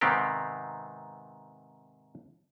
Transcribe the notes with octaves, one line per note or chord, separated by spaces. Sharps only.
G#2 C3 D#3 B3 C4 G4